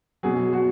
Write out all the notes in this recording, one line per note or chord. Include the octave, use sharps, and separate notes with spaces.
B2 F#3 G#4
F#4